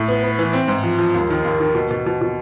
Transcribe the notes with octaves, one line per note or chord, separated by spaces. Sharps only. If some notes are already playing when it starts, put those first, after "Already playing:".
Already playing: A2
B3
B3
E3
C4
G#2
F3
F3
D#2
D#3
D#2
D#3
B2
B2
B2
B2